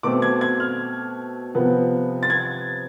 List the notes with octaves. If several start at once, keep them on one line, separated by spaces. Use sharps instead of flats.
B2 A3 C4 D6
G#6
G#6
F6
C3 F3 B3
A6
G#6